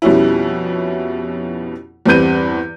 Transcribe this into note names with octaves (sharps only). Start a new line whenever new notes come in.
F2 B2 G3 C#4 E4
E2 G2 C4 B4 G6 D#7